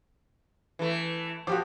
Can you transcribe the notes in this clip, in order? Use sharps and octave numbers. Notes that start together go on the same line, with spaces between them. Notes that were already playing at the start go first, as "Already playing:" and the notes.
E3 A3
F3 F#4 G4 D6